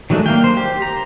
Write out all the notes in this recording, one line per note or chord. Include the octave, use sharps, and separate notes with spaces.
D#3 F#3 G#3 A3 D4
A#3 F5 G5
C5
G4
A#5